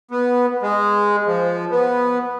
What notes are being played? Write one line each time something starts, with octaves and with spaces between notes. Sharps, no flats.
B3
G#3
F3
B3